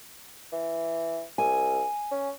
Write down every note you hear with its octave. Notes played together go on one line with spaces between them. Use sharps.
E3
C2 G#5
C#4